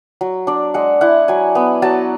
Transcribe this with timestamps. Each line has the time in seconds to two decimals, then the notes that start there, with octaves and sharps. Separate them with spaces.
0.21 F#3
0.47 D4 D5
0.74 G#3 F#5
1.01 E4 F#5
1.28 F#3 G#5
1.55 B3
1.82 F#3 A5